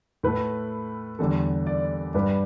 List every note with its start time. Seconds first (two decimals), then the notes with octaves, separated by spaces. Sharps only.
0.23 A2 A3 B4
1.19 E2 D3 G3 A4
1.67 D5
2.14 G2 G3 B4